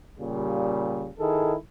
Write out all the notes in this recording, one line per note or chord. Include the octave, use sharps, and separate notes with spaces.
A#2 C#3 G3
D#3 E4 G#4 A4